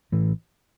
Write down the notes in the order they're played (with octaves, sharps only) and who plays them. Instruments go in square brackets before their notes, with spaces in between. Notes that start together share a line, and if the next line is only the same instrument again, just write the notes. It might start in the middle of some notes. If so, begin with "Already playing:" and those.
[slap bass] A1 A2 E3